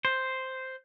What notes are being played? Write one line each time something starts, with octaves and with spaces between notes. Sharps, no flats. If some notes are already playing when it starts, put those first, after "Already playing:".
C5